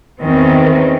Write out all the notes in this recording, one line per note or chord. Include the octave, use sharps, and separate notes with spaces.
E2 D#3 C4 C#4